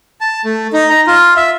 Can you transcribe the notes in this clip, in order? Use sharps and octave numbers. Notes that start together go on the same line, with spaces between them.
A5
A3
D#4
A#5
F4
E5